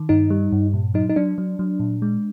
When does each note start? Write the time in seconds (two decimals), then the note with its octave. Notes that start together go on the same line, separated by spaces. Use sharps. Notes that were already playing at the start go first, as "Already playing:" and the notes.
Already playing: D#3
0.09 G2 D#4
0.30 G3
0.52 G2
0.74 A#2
0.94 F#3 D#4
1.10 D#4
1.16 F#3 D4
1.38 F#3
1.59 F#3
1.80 A#2
2.02 G#3